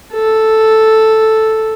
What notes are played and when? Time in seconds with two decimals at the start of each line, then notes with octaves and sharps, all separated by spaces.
0.13 A4